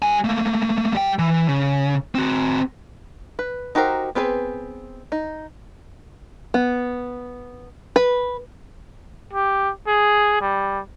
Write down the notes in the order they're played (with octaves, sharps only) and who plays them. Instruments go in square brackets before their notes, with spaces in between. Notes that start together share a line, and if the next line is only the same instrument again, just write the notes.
[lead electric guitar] G3 G#5
A3 A#3
G3 G5
E3
C#3
C4 F#4
[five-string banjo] B4
D#4 F#4 G4 A#4 C5
B3 C4 G#4 A4 B4
D#4
B3
B4
[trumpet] G4
G#4
G3